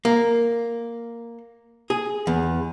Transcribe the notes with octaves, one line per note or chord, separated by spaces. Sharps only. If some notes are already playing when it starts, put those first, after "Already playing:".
A#3
G#4
E2